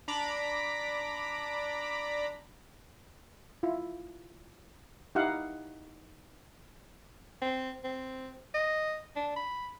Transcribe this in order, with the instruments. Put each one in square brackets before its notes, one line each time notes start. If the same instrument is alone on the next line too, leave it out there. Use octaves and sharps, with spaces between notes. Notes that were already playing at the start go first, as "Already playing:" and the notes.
[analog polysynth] D4 A#5 B5 D6
[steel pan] E4 F4
D#4 E4 G4 F5 F#5
[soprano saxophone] C4
C4
D#5
D4
B5